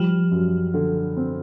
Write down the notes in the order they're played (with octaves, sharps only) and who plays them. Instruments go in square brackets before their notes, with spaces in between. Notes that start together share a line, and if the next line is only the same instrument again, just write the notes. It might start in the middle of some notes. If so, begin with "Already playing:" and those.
Already playing: [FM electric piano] F3 [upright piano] G3
[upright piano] F#2
D3
C4